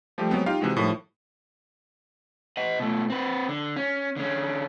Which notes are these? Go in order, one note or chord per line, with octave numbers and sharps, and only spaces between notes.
F3 G3 A3 G4
F#3 G#3 B3 C4
D#4 F4 G4 F5
C3 E3 G#3 F#4
A2 D#3 F3 G3
D#5 F#5
B2 A3
C4 B4
D3
C#4
D3 C#4